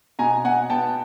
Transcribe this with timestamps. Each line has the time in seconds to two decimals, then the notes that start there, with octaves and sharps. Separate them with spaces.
0.19 B2 G#5 A#5
0.45 B2 F#5 G#5
0.70 B3 G5 A5